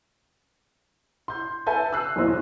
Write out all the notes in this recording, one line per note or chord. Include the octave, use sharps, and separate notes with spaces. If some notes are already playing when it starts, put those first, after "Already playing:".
C6 G6
A4 B4 E5 G#5 A5 G6
E6 F#6 C7
B1 E2 A#2 E4 C5 D#5